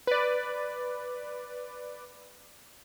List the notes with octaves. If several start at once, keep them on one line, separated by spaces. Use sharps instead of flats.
B4 D5